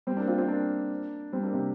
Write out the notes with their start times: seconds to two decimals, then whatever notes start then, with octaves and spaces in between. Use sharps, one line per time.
0.07 G3 C4
0.17 A#3 D4
0.28 C4 F4
0.38 C4 F4
0.49 A#3 D4
1.33 G3 C4
1.43 A#3 D4
1.54 C3